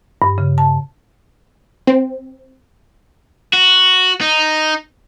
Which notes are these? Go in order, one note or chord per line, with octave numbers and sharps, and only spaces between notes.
G2
C#3
A5
C4
F#4
D#4